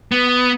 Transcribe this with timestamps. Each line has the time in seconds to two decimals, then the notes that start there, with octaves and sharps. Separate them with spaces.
0.12 B3